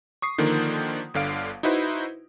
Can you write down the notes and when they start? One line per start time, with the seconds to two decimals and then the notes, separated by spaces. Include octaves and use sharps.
0.22 C#6 D#6 C7
0.38 D3 D#3 F3 A#3 C5
1.14 G1 D3 F5 D7
1.63 D#4 E4 F#4 B4 C5